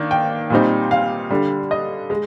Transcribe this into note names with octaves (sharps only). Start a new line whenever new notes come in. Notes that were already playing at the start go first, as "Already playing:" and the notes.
Already playing: D#3 A#3 D4
G5
A#2 G3 C4 D#4
F5
D3 G3 D4
D#5
G#3